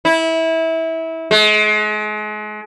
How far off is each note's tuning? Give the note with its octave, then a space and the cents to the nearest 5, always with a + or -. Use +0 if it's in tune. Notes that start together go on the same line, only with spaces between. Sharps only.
E4 -20
G#3 +35